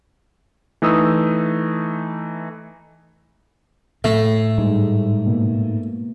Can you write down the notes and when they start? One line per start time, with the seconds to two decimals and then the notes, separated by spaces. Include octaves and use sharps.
0.82 E3 A3 D#4 D#6 E6
4.04 A2 A3
4.58 G#2 G3 G#3
5.26 B2 A#3